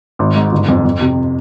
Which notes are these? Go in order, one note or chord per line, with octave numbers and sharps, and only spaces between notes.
G#1
G#2
G1
F2
F2
C3